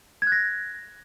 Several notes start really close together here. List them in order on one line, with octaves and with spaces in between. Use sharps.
G#6 F#6 A#6